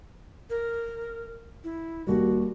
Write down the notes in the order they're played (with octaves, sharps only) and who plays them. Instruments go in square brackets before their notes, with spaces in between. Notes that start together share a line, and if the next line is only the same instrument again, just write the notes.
[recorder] A#4
E4
[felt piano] D#2 G3 [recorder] F#4